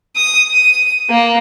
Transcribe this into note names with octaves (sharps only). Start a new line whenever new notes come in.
D#6
D#7
A#3